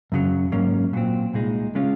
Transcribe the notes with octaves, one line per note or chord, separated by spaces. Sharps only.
F#2 C#3 F#3
G#2 F#3 A#3 C#4
A#2 F#3 C4
C2 A#2 G#3 D#4
C#3 G#3 C#4 F4